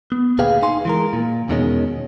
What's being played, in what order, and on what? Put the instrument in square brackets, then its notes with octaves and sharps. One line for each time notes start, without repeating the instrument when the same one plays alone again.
[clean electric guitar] B3
D2 A#2 G#4 B4 F5 G5
D#4 F5 G#5 C6
E3 G#3 A#4
A#2
E2 B2 D#3 G#3 C#4